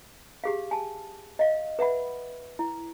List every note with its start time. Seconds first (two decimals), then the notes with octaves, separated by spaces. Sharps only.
0.44 G4 G#4 F5
0.71 G#5 A5
1.39 D#5 F5
1.79 B4 E5 F#5 B5
2.59 E4